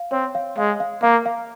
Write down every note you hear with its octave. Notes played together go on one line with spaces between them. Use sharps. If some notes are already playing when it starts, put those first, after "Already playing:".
Already playing: F5
C4 C#5
F5
G#3 F5
F5
A#3 F5
F5